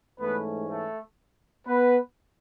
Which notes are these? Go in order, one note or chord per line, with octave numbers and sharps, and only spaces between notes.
G#2 E3 A3 B3 C#4 B4
A3 A4
B3 B4